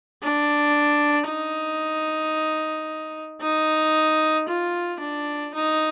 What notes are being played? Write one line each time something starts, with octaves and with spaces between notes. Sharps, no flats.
D4
D#4
D#4
F4
D4
D#4